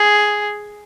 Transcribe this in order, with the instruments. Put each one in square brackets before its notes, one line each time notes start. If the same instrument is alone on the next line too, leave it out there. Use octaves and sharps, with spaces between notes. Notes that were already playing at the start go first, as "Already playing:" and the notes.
Already playing: [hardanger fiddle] G#4